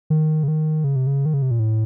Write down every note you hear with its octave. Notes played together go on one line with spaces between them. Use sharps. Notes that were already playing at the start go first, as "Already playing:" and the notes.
D#3
C#3
D#3
C#3
C3
C#3
D#3
C#3
C3
A#2
A2